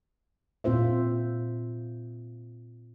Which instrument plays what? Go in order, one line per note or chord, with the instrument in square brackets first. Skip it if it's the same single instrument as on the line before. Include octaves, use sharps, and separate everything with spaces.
[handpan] A#2 C4 F4 C5 E5